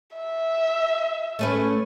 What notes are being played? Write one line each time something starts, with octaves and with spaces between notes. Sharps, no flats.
E5
A3 C#4 B4